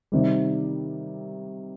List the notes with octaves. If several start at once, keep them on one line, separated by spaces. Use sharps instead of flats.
C3 D#3 G3